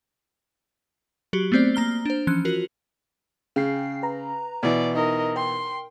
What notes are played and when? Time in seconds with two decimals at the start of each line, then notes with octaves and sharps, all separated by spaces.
1.33 F#3 F#4 G4
1.52 A3 B3 C4 C5 D5
1.75 A#3 A#5 F6 G7
2.05 D4 C5
2.27 E3 F3 C#4 F#6
2.45 F4 F#4 A#4
3.56 C#3 G#4 G5 C7
4.03 B4 A#5
4.63 B2 E3 D5
4.95 D#4 A#4 D#5
5.36 A#4 G5 C6